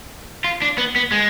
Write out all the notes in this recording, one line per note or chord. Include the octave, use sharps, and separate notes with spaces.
F4
D4
B3
B3
G#3